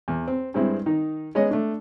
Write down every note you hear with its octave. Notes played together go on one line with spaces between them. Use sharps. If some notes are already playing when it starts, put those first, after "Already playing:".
E2
C4
G2 G#3 C4 E4
D#3 D#4
G#3 B3 C#4 C#5 D#5
A3 D4